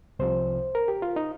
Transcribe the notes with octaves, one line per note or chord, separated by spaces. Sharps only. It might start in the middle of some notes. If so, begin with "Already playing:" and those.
C2 C3 F3 C5
A#4
G4
F4
D#4